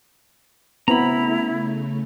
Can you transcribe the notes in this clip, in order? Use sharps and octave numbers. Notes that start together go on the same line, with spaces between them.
C#3 A3 B3 C4 E4 A#5 B5